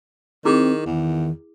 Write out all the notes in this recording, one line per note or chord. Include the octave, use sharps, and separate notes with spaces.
D#3 C4 E4 G#4 D6
E2 D#3